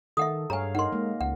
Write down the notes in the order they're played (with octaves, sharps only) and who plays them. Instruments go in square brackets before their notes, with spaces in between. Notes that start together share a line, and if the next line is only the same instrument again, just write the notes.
[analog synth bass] D#3 [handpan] A4 [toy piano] E5 F#5 D#6
[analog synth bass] G2 [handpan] G#4 C#5 F5 [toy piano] G#5 A#5
[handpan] D#4 A#4 [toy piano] F#5 C6
[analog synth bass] G#3 [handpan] A#3
[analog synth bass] C#2 [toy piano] F#5